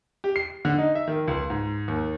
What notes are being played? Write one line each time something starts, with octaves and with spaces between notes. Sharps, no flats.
G4
C7
D3
D#4
E5
D#3
C#2
G#2
D#2